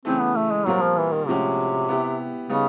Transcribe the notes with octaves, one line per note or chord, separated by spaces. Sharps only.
C#3 E3 A3 C4
B3
A3
G#3
A#2 F#3 G3 C4 F4 A#4
F3
E3
D#3
A2 C3 F3 G#3 C#4 F#4
B3 E4 G4
C#3 G3 B3 D#4